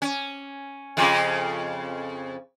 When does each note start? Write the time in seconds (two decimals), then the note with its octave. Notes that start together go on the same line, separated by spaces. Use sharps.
0.02 C#4
0.97 F2 C#3 F4